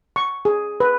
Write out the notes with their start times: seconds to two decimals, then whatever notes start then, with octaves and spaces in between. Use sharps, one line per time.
0.16 C#6
0.45 G#4
0.80 B4